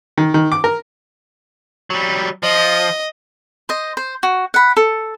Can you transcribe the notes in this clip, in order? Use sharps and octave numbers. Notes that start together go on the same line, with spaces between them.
D#3
D#3
D6
A#4
F#3 G3
F3 D#5
C5 D#5
C5
F#4
F#5 B5
A4